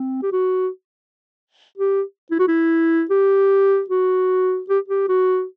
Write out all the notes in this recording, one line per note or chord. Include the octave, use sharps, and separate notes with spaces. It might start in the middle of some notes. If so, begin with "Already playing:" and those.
Already playing: C4
G4
F#4
G4
E4
F#4
E4
G4
F#4
G4
G4
F#4